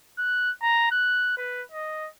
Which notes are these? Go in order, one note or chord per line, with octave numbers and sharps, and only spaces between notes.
F#6
A#5
F#6
B4
D#5